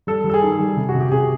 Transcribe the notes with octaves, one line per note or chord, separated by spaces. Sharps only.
G3 A4
G3
A4
G#4
D#3
G3
C3
F#4
C3
G4
C3 G#4